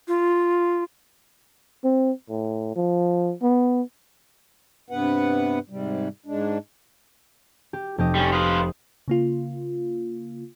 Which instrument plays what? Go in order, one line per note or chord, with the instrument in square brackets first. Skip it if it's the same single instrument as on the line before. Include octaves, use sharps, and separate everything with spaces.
[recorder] F4
[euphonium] C4
A2
F3
B3
[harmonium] G2 C3 B3 B4 F#5
G#2 C3 G3
G#2 G#3 D4
[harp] G4
F1 G4 D#5
[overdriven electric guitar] G3 C#4
[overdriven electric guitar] F4 B4 [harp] D#6
[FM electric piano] C#3 A#3 F4